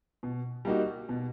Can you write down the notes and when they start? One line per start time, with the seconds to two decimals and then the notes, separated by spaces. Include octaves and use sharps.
0.23 B2
0.65 G3 A#3 D#4 F#4
1.09 B2